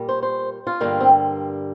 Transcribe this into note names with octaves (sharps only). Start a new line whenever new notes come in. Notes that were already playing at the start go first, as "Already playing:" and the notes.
Already playing: A#2 G3 A#3
C5
C5
F4
G2 D3 G3 A#3
C4